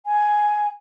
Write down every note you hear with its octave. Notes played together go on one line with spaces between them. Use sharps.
G#5